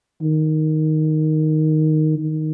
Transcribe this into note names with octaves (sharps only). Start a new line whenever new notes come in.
D#3
D#3